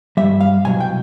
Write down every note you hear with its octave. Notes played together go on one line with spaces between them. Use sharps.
G2 D#3 G3 E5
F5
C2 B2 F#3 G#5
G5